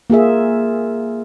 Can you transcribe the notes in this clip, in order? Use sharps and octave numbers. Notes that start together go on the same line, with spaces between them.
A#3 F4 G#4 E5